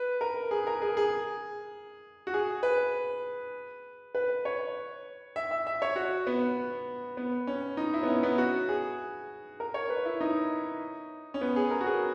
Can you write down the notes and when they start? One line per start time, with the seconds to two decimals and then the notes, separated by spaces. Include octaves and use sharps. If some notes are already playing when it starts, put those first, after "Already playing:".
Already playing: B4
0.21 A#4
0.51 G#4
0.67 A#4
0.82 G#4
0.97 G#4
2.27 F#4
2.34 G#4
2.63 B4
4.15 B4
4.45 C#5
5.36 E5
5.51 E5
5.67 E5
5.82 C#5
5.96 F#4
6.27 B3
7.17 B3
7.47 C#4
7.77 D#4
7.94 E4
8.03 B3
8.08 C#4
8.23 B3
8.38 F#4
8.69 G#4
9.60 A#4
9.74 C#5
9.90 B4
10.05 E4
10.21 D#4
11.34 C#4
11.41 B3
11.56 G#4
11.71 A#4
11.81 F#4
11.87 G#4